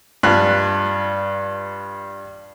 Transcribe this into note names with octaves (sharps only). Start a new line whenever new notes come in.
G2 F4 F#6